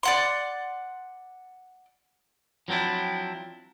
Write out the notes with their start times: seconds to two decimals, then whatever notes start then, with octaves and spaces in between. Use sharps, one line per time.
0.03 D5 F#5 C6
2.68 F3 F#3 C4 D4 E4